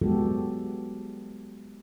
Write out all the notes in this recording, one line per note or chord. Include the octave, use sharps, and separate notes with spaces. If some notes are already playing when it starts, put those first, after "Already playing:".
F#3 G#3 B3 F#4 G4 A4